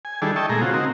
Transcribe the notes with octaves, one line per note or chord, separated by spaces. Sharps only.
G#5
D#3 G3 D4 E4 G#4 A4
D#5 E5 G5 A5 C#6
A#2 G#3 A3 G#4 A#5
C#3 C4 F4 F#4
C4 D#4 F#4 A#4